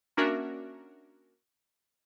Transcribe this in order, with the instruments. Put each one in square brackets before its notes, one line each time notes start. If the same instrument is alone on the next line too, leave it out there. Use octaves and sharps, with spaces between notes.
[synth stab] A#3 C#4 D4 F#4 A#4 E5